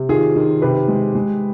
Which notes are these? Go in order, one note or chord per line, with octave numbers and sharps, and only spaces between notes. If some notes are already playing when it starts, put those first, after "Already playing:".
Already playing: C3
D#3 F4 G#4
D#3
C3 G4 B4
G#3
G#3